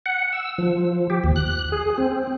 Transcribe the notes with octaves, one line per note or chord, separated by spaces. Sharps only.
F#5
E6
F3
G4
D#2
F#6
G#4
C4